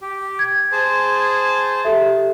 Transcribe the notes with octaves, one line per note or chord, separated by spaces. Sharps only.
G4
G#6
G#4 C5 A5
G4 A4 E5